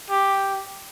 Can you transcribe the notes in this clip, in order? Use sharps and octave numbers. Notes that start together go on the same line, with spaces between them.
G4